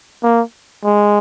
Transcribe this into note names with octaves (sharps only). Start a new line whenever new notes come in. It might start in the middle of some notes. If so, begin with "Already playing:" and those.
A#3
G#3